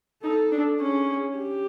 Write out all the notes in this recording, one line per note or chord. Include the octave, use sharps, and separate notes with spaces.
D#4 A4
D4
C#4 G#4
G4